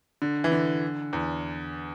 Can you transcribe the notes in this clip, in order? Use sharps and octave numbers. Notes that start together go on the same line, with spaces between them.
D3
E3
D3
E2